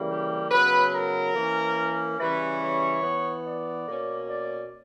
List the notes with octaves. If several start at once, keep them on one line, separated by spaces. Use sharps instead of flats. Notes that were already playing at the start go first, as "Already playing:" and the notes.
Already playing: C#3 E3 G3 A#3
G4
C#3 F#3 B3 B4
A#4
E3 A#3 C#4
C#3 E3 G3 C#4 B4
C#5
E3 B3
D5
B2 A#3 C#4
D5